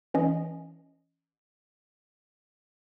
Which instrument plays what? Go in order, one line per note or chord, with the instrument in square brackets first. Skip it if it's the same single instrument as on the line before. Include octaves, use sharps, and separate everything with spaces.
[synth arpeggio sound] E3 C#4 D#5